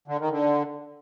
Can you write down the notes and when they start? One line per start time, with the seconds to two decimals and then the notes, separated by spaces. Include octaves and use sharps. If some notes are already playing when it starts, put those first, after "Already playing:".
0.08 D3
0.19 D#3
0.31 D3